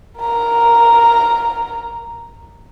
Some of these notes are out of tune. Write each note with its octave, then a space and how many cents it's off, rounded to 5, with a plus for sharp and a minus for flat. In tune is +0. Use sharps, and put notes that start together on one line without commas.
A#4 +0 A#5 +0